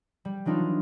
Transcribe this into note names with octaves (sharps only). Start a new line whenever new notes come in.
G3
E3 F#3 D4 D#4 F4